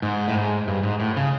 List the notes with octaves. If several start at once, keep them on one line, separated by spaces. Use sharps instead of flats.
G#2
A2
G#2
G2
G#2
A2
C#3